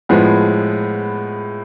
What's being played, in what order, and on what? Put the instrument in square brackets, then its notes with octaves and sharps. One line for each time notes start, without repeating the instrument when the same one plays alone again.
[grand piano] A2 F3 G#3 B3